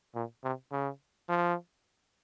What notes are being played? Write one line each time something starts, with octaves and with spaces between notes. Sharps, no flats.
A#2
C3
C#3
F3